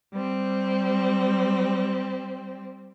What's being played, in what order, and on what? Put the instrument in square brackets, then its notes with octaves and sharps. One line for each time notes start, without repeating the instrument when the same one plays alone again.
[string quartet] G3 C4